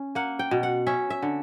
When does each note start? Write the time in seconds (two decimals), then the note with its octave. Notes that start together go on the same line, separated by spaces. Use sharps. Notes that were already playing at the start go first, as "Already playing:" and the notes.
Already playing: C#4
0.15 A#3 F#5
0.39 G5
0.51 B2
0.63 F#5
0.87 C#4 E5
1.10 E5
1.23 D3